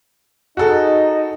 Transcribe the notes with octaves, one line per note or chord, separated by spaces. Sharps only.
D#4 F#4 G#4 A4